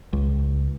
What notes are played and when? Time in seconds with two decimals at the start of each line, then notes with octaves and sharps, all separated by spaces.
0.13 C#2